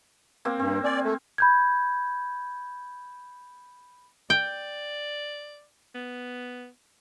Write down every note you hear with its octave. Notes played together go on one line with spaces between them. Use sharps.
A#3 C4
G2 C4
D5 G#5
A3
B5 G6 G#6
D5 G5
B3